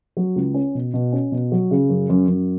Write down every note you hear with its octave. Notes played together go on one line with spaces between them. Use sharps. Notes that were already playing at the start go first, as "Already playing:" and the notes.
F#3
C#2
C#4
B2
B2
C#4
B2
F#3
C#3
F#2
F#2
F#2